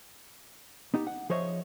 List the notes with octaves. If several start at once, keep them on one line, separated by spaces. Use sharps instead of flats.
B3 D#4 G4
F#5
F3 G#4 C5 C#5 D#5 E5